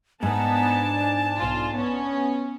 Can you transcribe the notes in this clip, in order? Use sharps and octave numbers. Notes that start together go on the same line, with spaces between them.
G#2 B3 D4 D#4 G#5 A5
B1 F4
B3 C#4